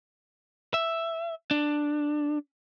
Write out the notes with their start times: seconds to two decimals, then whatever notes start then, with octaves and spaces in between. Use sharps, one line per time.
0.74 E5
1.51 D4